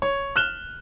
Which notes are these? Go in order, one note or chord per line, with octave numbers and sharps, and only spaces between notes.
C#5
F6 F#6 E7 G7